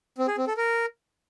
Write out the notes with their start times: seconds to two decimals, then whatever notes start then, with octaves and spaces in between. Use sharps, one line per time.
0.18 C4
0.28 G#4
0.38 C4
0.47 A4
0.57 A#4